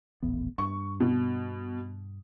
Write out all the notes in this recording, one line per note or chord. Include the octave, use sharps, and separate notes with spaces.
D#1 A1 B3
G2 C#6
B2